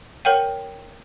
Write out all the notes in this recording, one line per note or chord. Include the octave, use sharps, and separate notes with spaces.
A#4 C#5 F#5 G5